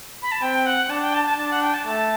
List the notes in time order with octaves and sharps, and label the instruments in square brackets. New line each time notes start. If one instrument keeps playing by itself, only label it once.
[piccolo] B5
A5
[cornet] C4 [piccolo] G5
[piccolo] F#5
[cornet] D4 [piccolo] A5
[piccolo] G5
A5
A5
[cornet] D4 [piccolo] A5
[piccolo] F#5
G5
A5
[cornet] A3 [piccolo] A5